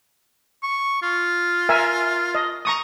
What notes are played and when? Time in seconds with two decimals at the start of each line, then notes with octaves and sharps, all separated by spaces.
0.63 C#6
1.02 F4
1.69 A#4 E5 G#5
2.35 D#5
2.65 A#5 C#6 D#6